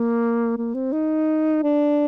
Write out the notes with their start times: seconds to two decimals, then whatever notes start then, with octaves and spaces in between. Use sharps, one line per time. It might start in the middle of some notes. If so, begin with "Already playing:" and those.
Already playing: A#3
0.57 A#3
0.74 C4
0.92 D#4
1.63 D4